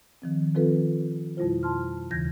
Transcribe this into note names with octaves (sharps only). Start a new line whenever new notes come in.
D#3 F3 C4
D#3 F3 C4 F4 A4 B4
F2 B2 G3 E4 F4 C5
A5 C6 F6
D#2 C#3 E3 G6 G#6 A#6